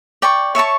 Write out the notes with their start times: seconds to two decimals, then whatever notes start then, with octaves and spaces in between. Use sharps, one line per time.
0.22 D5 G5 C#6
0.55 C#5 E5 A5 C#6